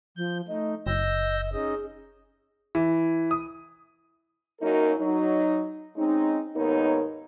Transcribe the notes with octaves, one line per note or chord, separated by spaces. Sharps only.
F3 G6
A3 D#4 D#5
F#1 D#5 E6 G6 A#6
C#4 D#4 G#4 D#5
E3
D#6
F#2 F#3 A#3 D#4 A#4
F#3 D#4
G#3 C4 C#4 D#4
D#2 G#2 B3 D#4 A#4 C#5